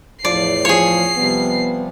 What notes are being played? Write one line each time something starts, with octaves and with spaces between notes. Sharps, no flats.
E2 A2 F3 D5 C7
F3 G#4 C#5
C3 F3 G3 B3